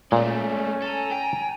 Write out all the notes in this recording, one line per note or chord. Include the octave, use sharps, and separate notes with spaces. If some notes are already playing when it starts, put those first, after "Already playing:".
A#2 G#3 A3 C#4
A4 G#5 A#5
G5